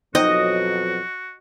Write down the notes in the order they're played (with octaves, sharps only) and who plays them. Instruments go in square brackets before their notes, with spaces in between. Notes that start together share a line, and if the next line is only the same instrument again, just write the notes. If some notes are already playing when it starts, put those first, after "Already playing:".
[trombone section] F2 B2 F#3 [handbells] D#4 C5 G5 [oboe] F#4 [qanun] D#5